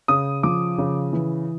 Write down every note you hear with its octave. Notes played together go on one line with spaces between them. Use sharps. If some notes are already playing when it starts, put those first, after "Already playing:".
C#3 D#6
F3 D6
C#3
E3